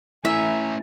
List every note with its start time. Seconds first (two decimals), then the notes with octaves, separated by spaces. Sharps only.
0.25 A3 C#4 E4 E5 G#5 A#5